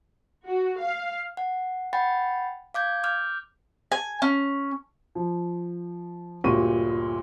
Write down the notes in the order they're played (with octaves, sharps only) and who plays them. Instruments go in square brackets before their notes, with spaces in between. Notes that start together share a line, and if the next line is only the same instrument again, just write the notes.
[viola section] F#4
F5
[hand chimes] F#5
F#5 G5 B5 A6
F5 D6 G6 G#6
D6 F6 G6
[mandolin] G#5
C#4
[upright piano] F3
G1 D2 A#2 G4 C#6 D#7